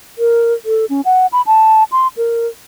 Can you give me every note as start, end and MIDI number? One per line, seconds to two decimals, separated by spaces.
0.18 0.53 70
0.66 0.85 69
0.90 1.01 61
1.05 1.27 78
1.33 1.42 83
1.47 1.84 81
1.92 2.08 84
2.17 2.47 70